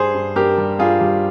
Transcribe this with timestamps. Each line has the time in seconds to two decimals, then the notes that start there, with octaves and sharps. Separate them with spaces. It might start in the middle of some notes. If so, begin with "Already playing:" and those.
Already playing: G2 G#4 C5
0.14 G2
0.36 G2 G4 A#4
0.58 G3
0.79 G2 F4 G#4
1.01 G3